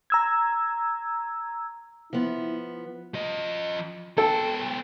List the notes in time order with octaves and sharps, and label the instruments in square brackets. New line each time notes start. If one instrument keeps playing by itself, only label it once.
[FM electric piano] A#5 E6 G#6
[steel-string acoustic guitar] F3 B3 [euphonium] E4
[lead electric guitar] F3 D#5
[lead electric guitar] B3 G5 [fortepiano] A4